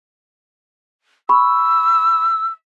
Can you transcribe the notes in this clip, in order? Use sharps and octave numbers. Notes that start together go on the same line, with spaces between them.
B5 C#6 E6